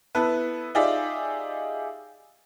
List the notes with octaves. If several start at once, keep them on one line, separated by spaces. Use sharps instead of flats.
B3 E4 A4 B4
D#4 F4 G4 G#4 D5 E5